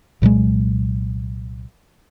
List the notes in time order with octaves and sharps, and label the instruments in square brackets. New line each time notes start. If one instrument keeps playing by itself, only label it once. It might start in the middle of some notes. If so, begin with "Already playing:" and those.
[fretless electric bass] C2 A#2 F#3 G#3